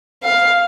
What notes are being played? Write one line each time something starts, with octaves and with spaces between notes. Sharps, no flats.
F5